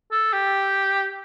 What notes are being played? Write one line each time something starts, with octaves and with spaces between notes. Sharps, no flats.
A4
G4